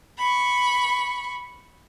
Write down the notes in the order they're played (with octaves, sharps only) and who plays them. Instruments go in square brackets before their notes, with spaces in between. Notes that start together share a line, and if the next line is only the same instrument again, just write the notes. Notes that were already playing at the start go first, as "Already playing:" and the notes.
[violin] B5 C#6